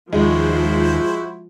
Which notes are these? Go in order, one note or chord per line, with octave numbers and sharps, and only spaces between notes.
D#2 F3 G#3 E4 F#4 C5